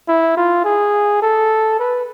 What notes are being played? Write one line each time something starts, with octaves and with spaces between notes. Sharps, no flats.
E4
F4
G#4
A4
B4